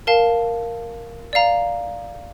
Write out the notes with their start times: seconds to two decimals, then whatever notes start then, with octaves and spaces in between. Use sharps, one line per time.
0.07 A#4 F5 A5
1.33 D5 F5 A#5